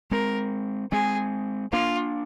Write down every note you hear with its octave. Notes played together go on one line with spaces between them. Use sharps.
G#3 C4 A#4
G#3 C4 G#4
A#3 D4 F4